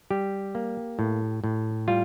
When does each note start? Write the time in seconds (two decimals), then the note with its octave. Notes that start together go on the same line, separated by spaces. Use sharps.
0.10 G3 G4
0.55 A#3
0.99 A2
1.44 A2
1.88 G3 F4